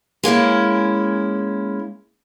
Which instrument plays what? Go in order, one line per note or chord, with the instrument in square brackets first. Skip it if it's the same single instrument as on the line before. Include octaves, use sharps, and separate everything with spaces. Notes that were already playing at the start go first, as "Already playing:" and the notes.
[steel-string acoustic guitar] G#3 A#3 C#4 E4